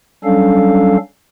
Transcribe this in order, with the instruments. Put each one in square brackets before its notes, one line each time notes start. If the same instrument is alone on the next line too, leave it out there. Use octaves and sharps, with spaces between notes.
[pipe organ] F#3 G3 C#4 D4 A4 F5